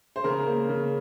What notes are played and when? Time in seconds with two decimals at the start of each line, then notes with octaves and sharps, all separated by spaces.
0.16 C5
0.24 C#3 A#4
0.47 A#3
0.69 C#3